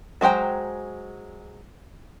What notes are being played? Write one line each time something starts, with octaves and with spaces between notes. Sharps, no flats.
F#3 G#3 C5 G5 A#5